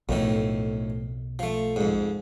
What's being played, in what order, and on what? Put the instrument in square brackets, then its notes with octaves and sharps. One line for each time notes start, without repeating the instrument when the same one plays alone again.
[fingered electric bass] B1 [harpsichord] F2 A2 D#3
[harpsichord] F3 A3
F2 G#2